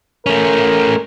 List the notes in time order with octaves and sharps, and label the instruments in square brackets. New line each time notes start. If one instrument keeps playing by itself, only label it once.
[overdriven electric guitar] A3 C#4 [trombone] A#4